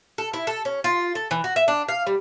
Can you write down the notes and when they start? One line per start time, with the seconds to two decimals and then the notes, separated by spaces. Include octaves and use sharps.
0.18 A4
0.33 E4
0.47 A4
0.65 C#4
0.84 F4
1.15 A4
1.31 E3
1.44 F#4
1.56 E5
1.68 D4
1.88 F5
2.07 G3